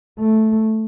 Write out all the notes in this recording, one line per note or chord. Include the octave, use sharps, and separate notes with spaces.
A3